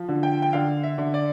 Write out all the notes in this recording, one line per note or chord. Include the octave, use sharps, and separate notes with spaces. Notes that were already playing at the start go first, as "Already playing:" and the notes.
Already playing: F3
D3
G5
G5
D3 F5
E5
D3
D5